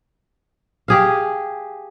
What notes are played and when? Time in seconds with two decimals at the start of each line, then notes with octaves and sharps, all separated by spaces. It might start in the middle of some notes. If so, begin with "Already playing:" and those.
0.88 G4 G#4 F5